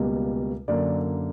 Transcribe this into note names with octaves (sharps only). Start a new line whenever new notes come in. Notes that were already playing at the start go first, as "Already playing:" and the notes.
Already playing: C#2 B2 G3 A#3
F#2 D3 A#3 D5